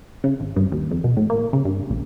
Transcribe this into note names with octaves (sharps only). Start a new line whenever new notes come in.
C#3
G#1
G2
D#2
F2
B2
A2
A#3
C#3
G2
A#1